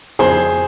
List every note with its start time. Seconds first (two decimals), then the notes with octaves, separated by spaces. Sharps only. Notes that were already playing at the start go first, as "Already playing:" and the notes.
0.19 F2 G#4 C5